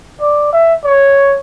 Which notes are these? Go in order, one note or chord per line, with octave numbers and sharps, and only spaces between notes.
D5
E5
C#5